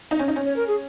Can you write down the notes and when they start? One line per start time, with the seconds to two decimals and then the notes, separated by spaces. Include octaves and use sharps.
0.11 D#4
0.19 C#4
0.28 D#4
0.36 C#4
0.45 C#5
0.56 A#4
0.67 G#4